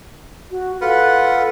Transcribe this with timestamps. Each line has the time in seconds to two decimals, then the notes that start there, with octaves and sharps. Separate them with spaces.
0.51 F#4
0.81 F4 A4 B4 F#5